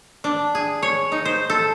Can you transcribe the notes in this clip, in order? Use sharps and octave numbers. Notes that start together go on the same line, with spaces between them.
D4
G#4
C#5
D#4
C5
A4